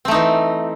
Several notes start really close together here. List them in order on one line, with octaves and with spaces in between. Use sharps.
C4 A3 D#4 E3